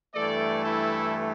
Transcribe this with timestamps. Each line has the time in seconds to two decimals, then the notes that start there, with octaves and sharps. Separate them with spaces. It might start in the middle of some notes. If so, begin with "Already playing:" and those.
0.14 G2 E3 A3 A4 D5
0.64 E4 A4